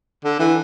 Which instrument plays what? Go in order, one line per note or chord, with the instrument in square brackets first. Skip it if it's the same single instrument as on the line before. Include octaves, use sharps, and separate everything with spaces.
[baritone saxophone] D3
E3